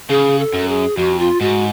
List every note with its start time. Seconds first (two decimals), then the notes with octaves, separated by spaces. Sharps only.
0.10 C#3 G#4
0.39 A4
0.54 F#2
0.69 G#4
0.97 F2 F#4
1.19 F4
1.41 G#2 F#4